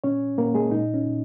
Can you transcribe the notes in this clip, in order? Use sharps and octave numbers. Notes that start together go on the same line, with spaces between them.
A#2 C#4 C#5
A#2 A#3 A#4
G#3 G#4
A#2 D#4
C#4
A#2